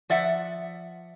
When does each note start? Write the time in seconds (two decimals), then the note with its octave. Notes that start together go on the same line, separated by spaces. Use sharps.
0.10 F3 D5 E5 F#5